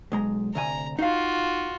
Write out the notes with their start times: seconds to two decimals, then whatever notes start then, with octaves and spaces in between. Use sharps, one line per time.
0.12 B1 G#3 A#5
0.55 D2 C3 G#5 A#5
0.99 D#4 F4 F#4 F5